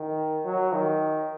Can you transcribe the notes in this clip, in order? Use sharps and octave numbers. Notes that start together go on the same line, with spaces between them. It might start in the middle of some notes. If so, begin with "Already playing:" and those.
Already playing: D#3
F#3
D#3